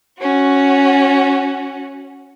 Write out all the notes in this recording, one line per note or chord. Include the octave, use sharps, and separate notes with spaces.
C#4 F#4